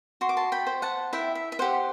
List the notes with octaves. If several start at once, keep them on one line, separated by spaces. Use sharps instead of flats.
F#4 C6
D6
A5 C6
G5 B5
C5
F#5 A5
E4 E5 G5
E5
E5
G4 C5 F#5